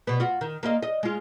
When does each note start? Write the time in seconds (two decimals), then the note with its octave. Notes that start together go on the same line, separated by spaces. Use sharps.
0.07 B2 B3
0.20 F4 F#4
0.41 D#3
0.63 A#3 F4 D#5
0.83 D#5
1.03 G#3 F4